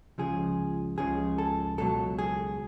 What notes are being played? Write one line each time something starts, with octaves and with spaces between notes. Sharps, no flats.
C#2 C#3 F3 G#4
C#2 C#3 F3 G#4
A4
C#2 B2 F#3 A4
G#4